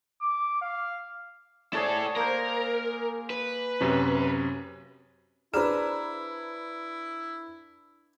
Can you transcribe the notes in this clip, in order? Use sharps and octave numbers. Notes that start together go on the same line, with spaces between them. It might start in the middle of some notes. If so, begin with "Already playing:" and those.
D6
F5
E4 G#4 A4 C#5 D5
A#3 A#4 C5
B4
F#2 C3 C#4
D4 E4 G#4 B4 C5 A#5